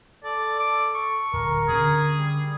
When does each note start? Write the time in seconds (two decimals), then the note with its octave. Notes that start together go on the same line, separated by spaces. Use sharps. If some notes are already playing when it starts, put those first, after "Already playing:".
0.24 A4 D5
0.60 D6
0.95 C#6
1.33 D1 A#4
1.68 D3 C#4 G#4
2.16 G3